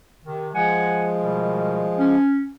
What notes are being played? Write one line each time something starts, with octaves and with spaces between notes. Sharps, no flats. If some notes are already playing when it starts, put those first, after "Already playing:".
C3 D#3
F3 G#3 F#5 G#5
B2 D#3 G3
C#4